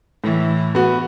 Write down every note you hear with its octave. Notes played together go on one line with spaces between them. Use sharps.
A2 E3
B3 F#4